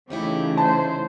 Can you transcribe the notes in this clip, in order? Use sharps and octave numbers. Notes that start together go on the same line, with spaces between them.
C#3 E3 A3 C#4 D#4 E4 G4
C5 A5